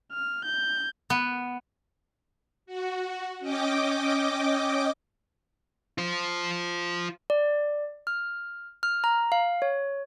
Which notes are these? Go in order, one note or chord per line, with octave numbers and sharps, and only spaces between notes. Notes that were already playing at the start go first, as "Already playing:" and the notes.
F6
G6
B3
F#4
C#4 D#5 G5 D6
F4 C5
D5
F6
F6
A#5
F5
C#5